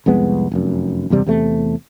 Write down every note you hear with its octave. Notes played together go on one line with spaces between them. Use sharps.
C2 F2 G#3 B3
F1 F#2
F#1 E2 C3 G3
E2 C3 A3